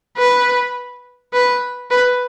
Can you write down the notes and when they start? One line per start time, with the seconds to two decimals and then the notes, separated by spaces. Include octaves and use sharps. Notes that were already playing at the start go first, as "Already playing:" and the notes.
0.17 B4
1.33 B4
1.91 B4